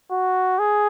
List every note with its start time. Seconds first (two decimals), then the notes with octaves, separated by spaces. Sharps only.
0.11 F#4
0.59 G#4